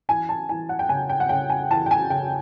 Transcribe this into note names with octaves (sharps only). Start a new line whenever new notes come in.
E3 G#5
A5
E3 G#5
F#5
G5
C#3 G#5
G5
F#5
C#3 G5
G#5
E3 A5
G5
G#5
C#3 G5